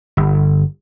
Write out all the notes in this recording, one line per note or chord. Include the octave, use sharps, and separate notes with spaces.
G1